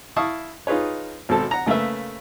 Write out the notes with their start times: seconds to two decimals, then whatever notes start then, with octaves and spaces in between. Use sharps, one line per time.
0.16 E4 F5 A5 C#6 D#6
0.67 D#4 F4 G#4 B4 C#5
1.29 G#1 B2 C4 A4 A5
1.51 F#5 A#5
1.66 C#3 A3 A#3 B4 E5